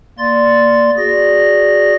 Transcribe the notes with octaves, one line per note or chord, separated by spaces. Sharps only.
A#3 D5 C6 A6
F#4 G#4 D5 A#6